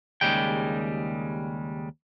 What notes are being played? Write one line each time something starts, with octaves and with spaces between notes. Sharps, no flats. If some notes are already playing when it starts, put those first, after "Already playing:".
D#2 C#3 G3 G#3 G5